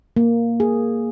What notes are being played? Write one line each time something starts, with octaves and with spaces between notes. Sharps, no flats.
A#3
G#4